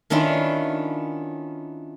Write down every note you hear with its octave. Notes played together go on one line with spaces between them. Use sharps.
D#3 B3 C#4 D4 E4 F4